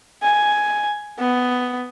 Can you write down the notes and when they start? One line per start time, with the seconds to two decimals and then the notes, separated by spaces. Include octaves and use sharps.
0.23 G#5
1.19 B3